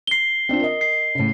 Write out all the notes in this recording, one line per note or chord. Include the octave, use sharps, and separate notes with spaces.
C7 G7
C4 D4 F4
A#4 D#5
C7
A2 C#3